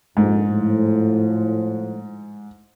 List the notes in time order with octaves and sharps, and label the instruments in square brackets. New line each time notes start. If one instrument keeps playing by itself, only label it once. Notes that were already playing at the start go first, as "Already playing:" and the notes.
[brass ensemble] A#1 F2 [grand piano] G#2
[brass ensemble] A2 F3